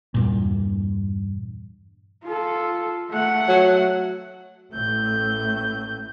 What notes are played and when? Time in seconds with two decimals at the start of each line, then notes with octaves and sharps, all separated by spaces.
0.14 E2 G2 A#2
2.24 F4 A4
3.11 A3 F#5
3.48 F#3
4.72 A1 A2 A3 G6